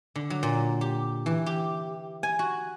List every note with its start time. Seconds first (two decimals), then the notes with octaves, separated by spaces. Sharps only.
0.16 D3
0.30 F#3
0.43 A#2
0.81 G4
1.26 E3
1.46 G4
2.23 G#5
2.39 F#4